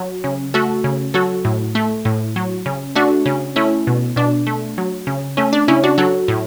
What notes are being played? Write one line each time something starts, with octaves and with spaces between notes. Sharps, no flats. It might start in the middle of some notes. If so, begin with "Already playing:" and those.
Already playing: F#3
C#3
A3 F#4 A4
C#3
F#3 F#4 A4
A2
A3
A2
F#3
C#3
A3 D4 F#4
C#3
A3 C#4 E4
B2
B2 D4
A3
F#3
C#3
A3 C#4
D4
C#3 C#4 E4
D4 F#4
F#3 F#4 A4
A2